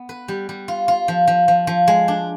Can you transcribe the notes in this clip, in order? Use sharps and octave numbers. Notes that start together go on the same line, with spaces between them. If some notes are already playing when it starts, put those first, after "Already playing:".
Already playing: B3
B4
G3
G3
F4
F4
F3
F3
F3
F3
G#3
D4